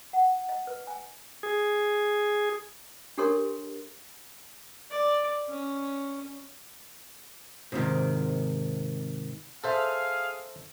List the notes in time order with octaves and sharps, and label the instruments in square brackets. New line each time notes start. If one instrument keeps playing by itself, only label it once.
[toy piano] F#5
D#5
B4
G#5
[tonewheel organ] G#4
[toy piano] D4 G4 A4 A#4 C#5 C6
[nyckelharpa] D5
C#4
[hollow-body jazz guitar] G#2 C3 D#3
[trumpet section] G#4 F5 [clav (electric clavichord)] A4 C5 E5